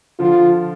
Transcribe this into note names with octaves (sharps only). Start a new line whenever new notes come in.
D3 F3 F4